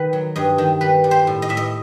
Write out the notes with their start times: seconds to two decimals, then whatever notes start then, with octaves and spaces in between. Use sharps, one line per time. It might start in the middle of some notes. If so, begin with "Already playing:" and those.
Already playing: D#3 B4
0.13 F#3
0.36 G2 D#5
0.58 D#3
0.81 G3 B4
1.04 G3
1.11 C5
1.27 A2
1.42 D#5
1.49 A2 E5
1.57 D#5